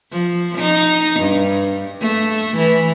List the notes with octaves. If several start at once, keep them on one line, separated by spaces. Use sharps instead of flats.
F3
D#4
G2
A3
E3